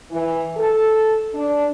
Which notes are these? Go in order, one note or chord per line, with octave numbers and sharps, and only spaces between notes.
E3
A4
D4